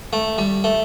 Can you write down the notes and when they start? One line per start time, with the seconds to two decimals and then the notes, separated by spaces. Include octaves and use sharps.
0.13 A3
0.38 G3
0.64 A3